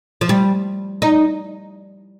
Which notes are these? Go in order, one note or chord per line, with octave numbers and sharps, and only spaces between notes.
F3
G3
D#4